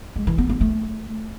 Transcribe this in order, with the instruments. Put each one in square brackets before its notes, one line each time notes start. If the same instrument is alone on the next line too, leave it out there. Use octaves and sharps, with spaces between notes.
[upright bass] G#3
E3
B3
B3
A3